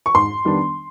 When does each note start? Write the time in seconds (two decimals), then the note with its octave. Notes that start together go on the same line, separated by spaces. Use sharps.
0.06 C#6
0.15 G#2 C6
0.45 D#3 G3 B3 D4